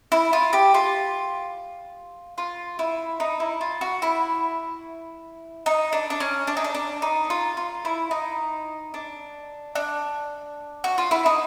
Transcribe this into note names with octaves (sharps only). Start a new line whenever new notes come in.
E4
F4
G4
F4
F4
E4
D#4
E4
F4
F#4
E4
D#4
D4
D4
C#4
D4
D#4
D4
D4
D#4
F4
F4
E4
D#4
D4
D4
F#4
F4
E4
D#4